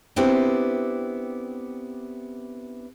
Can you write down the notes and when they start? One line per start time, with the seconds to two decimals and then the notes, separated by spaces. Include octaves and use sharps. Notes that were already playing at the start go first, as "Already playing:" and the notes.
0.16 B3 C4 D4 E4 G4